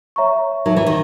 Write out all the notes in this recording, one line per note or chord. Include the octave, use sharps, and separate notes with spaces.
C#5 E5 A#5 C#6
F#3 D#4 A#4 E5
E3
D#3